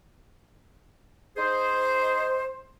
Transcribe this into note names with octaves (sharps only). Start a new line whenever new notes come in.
D#4 G#4 C5